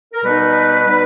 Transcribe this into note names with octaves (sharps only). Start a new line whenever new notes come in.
A#4
B2 G3 B3 D#4 B4
B2 G3 B3 D#4